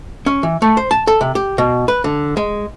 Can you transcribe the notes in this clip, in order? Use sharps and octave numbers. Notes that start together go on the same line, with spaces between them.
C#4
E3
A3
C5
A5
A4
C3
G4
B2
B4
D3
G#3